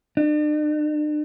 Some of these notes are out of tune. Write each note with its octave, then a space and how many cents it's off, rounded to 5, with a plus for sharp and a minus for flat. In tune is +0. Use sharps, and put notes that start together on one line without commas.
D4 +45